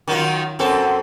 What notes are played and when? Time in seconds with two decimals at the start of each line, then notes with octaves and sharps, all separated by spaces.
0.08 D#3 F#3 F4
0.59 F#2 C4 A4